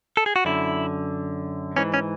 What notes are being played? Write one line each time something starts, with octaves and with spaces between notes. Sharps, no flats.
A4
G#4
F#4
F#2 D3 E4
G#2 E3 C#4
C#4